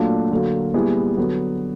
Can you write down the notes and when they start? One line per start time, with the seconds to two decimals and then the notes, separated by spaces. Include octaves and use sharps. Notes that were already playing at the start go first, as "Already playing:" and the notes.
Already playing: A#2 F#3 A3 D4 F4
0.31 D3 F#3 A#3
0.74 A#2 G3 B3 E4 G#4
1.17 D3 F#3 B3